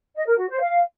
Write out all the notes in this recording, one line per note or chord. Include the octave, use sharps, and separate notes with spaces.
D#5
A#4
F#4
C5
F5